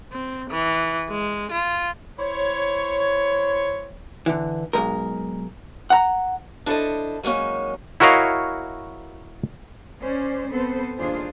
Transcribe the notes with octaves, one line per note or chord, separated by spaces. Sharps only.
C4
E3
G#3
F4
E4 C5 C#5
D3 E3
B1 F2 G#3 A#4
F#5 A#5
D4 E4 A4 C5 D#5
F#3 G#3 A#3 C#4 D#4
E4 F#4 A#4 C#5 D#5 F5
C#4 C5 D5
B3 C4 A4 B4 C5
D#2 D4 F4 G#4 C5